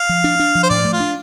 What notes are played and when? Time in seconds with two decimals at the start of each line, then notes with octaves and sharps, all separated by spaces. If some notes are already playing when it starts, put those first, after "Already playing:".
Already playing: F5
0.09 F3
0.24 D4
0.39 D4
0.55 F3
0.63 C5
0.70 A2 D5
0.85 A3
0.93 F4
1.00 D4